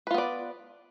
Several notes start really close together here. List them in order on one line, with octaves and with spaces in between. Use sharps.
B4 F4 B3 D5